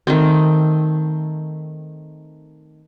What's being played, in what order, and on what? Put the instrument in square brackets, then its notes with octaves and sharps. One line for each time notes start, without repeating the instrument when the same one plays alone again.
[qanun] D#3 A3 C4